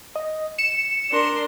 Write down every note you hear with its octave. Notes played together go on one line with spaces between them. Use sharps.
D#5
C#7 E7
D4 A#4 C6